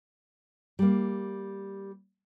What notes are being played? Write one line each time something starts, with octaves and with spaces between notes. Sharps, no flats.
G3 A#3